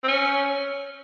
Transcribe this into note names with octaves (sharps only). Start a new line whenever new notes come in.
C4
C#4